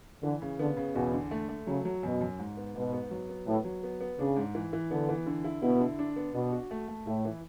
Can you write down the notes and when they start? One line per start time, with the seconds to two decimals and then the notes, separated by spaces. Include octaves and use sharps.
0.23 D3 E3
0.42 C#3
0.59 D3 B3
0.77 C#3
0.95 E2 B2
1.13 D3
1.31 A3
1.49 A3
1.67 C#3 F#3
1.85 F#3
2.03 F#2 B2
2.21 F#2
2.39 G#2
2.57 B3
2.75 G#2 B2
2.93 B3
3.11 F#3
3.29 B3
3.47 A2 B3
3.65 F#3
3.83 B3
4.01 B3
4.19 C#3 D4
4.37 G#2
4.55 E3
4.73 E3
4.91 D3 B3
5.09 E3
5.26 D3
5.44 E4
5.62 B2 E4
5.81 D3
5.99 D4
6.16 B3
6.34 B2 D4
6.52 F#4
6.71 A3
6.88 A3
7.06 A2 E4
7.25 E3